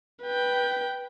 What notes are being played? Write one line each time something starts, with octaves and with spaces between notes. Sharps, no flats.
B4 G5